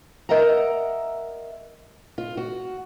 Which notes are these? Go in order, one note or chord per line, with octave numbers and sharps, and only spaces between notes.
A#4 D#5 E5 F#5 A#5
F4
F#4